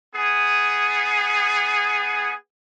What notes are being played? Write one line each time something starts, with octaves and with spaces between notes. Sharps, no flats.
B3 G#4